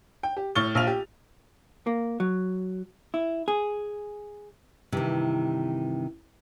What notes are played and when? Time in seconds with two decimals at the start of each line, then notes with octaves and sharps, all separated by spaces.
0.23 G5
0.37 G4
0.55 A2 C#6 F6 A6 G7
0.75 A#1 F4 F6 F7
0.87 G4
1.86 A#3
2.20 F#3
3.14 E4
3.48 G#4
4.92 G2 C3 D#3 E3